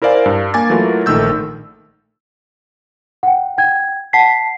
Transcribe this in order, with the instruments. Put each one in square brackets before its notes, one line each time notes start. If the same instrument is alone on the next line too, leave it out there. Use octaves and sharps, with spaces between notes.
[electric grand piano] E4 A#4 C5 D5 F5 G#5
G2
A#3 G#5 D6 A6
E3 F#3 A3 F4 A#4
A#1 D#3 A3 E6 G6
[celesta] F#5 G5
G5 G#6
F#5 A5 B6 C7